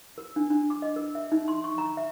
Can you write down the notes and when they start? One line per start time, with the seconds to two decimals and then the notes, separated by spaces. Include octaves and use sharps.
0.18 A#4
0.36 D4
0.50 D4
0.70 D6
0.82 D#5
0.96 A#4
1.15 E5
1.32 D#4
1.48 C6
1.64 C#6
1.78 A#5
1.97 E5